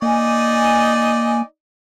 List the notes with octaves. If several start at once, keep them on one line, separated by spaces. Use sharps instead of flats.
A#3 D#4 D5 D#5 G#5